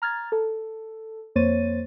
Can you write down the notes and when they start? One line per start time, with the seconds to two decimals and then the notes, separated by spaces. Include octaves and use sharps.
0.02 A#5 F6 G#6 A6
0.32 A4
1.35 F2 A#3 C5 C#5 A6 D#7